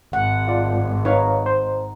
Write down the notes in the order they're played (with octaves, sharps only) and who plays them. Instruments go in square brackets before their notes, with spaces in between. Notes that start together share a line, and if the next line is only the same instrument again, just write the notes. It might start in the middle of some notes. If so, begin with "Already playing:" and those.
[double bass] G#1 [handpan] F#5
[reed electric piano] F4 D5
[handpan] D#4 [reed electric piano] B4 C#5 F5
[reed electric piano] C5